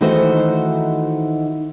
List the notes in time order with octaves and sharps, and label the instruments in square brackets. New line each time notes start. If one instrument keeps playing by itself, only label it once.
[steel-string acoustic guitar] D#3 E3 A3 D#4 F#4 C5